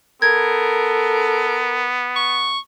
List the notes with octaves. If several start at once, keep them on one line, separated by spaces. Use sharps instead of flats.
B3 A4 A#4 G#6
C#6